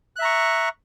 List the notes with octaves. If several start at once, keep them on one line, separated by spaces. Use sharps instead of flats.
E5 A#5 C#6 F#6